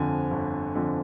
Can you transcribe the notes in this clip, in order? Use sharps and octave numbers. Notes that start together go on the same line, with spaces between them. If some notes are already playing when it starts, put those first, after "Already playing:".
Already playing: G1 F2 D3 F3 G#5
G1
F2 D3 F3